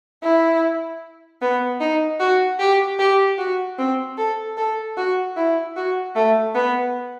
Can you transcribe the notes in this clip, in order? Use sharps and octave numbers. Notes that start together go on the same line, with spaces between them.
E4
B3
D#4
F#4
G4
G4
F#4
C4
A4
A4
F#4
E4
F#4
A3
B3